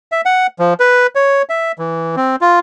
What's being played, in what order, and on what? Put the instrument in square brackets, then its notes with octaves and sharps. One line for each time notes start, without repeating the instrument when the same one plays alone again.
[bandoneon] E5
F#5
F3
B4
C#5
E5
E3
C4
F4